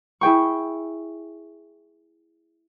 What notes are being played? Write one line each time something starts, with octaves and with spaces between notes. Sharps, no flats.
E4 G#4 G5 C#6